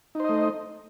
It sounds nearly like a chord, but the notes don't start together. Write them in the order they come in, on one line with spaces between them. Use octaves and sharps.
D#4 C5 D#5 A3